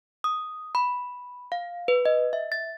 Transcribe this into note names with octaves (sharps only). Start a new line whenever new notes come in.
D#6
B5
F5
B4
D#5
E5
A6